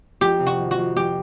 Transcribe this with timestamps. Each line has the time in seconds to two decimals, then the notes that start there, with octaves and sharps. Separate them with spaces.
0.21 F2 G4
0.40 C3
0.47 F#4
0.59 D#3
0.71 F#4
0.78 F2
0.96 F2 G4